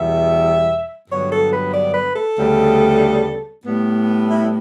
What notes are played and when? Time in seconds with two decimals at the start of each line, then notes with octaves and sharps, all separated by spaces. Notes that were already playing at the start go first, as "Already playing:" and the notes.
Already playing: E2 B2 G3 E5
1.09 G2 D3 F#3 B3 C#5
1.31 A4
1.52 B4
1.74 D5
1.94 B4
2.15 A4
2.38 D2 C#3 G3 B3
3.65 A2 G3 B3
4.28 E4